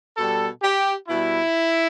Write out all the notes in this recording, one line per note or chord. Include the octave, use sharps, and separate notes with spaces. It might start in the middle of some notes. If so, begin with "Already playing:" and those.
B2 G3 A4
G4
B2 G3 E4